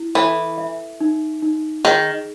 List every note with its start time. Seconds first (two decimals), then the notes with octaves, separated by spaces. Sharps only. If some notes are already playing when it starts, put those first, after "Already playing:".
Already playing: E4
0.15 E3 A4
0.58 E5
1.01 D#4
1.42 D#4
1.85 D#3 G#4